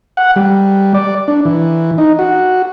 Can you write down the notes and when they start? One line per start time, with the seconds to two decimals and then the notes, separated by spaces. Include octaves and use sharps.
0.17 F#5
0.36 G3
0.94 D5
1.28 D4
1.45 E3
1.98 D#4
2.19 F#4